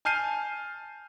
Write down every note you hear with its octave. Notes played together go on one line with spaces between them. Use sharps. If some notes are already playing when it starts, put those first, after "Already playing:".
G#5 A5 F6 G6 C7 D#7